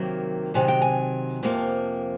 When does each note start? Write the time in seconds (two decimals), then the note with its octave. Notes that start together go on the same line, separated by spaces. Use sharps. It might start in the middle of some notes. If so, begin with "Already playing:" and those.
Already playing: C3 D#3 F#3 A#3
0.54 C3 D#3 F#3 G#5
0.68 G5
0.82 G#5
1.43 F2 C3 F3 A#3